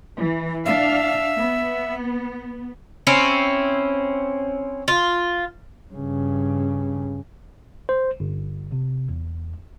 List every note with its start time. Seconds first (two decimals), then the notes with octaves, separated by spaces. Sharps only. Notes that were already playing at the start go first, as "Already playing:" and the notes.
0.19 E3
0.65 D4 E5 F5
1.38 B3
3.07 C4 C#4 E4
4.88 F4
5.93 G2 C#3
7.89 C5
8.20 G1
8.72 C3
9.09 E2